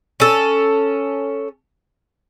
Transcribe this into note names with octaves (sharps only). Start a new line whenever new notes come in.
C#4 A4